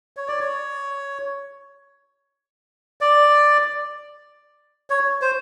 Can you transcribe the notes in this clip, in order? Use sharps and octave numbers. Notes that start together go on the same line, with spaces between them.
C#5
D5
C#5
D5
C#5
C5